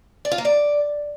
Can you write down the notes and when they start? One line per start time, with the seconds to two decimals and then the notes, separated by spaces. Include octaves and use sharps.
0.25 D5
0.32 F4
0.38 A#3
0.45 D5